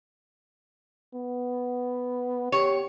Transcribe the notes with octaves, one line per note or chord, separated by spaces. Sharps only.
B3
G4 C#5